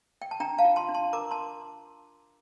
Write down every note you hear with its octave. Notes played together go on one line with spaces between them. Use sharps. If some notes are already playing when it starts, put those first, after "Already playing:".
G5
A5
D4 G5 A#5
F5 A5
F4
A5 C6
D4
A5 C6
A#4 A#5 D6
A5 C6